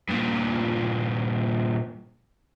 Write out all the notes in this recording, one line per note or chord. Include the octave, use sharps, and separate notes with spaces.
G2 A#2